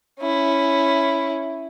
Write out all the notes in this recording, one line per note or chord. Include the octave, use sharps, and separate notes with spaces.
C#4 E4